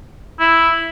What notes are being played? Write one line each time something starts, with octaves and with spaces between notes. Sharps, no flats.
E4